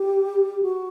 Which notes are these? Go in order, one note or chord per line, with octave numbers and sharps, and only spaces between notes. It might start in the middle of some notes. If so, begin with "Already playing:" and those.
Already playing: G4
F#4